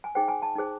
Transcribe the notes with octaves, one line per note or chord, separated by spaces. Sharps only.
G#5
D#4 G#4 C5 G5
G#5
A5
D#4 G#4 C5